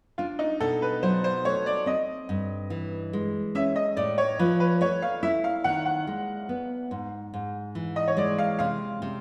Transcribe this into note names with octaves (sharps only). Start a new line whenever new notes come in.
D4 F4
D#4
B2 A4
B4
F#3 C5
C5
A3 C#5
D5
C4 D#5
G2
E3
G#3
C#4 E5
D#5
A2 D5
C#5
F3 B4
B4
A3 C#5
F5
E4 E5
F5
D#3 F#5
F#5
G#3
B3
G#2
G#2
E3
D#5
C#5
G#3 D5
F5
C3 F5
C3